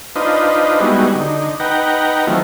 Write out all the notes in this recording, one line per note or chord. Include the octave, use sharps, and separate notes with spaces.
D4 D#4 F4 B4 C5 D#5
G3 G#3 B3 D#4 E4 F#4
D3 D#4
D#4 B4 F#5 G5 A#5
D#3 F3 F#3 A3 C4 E4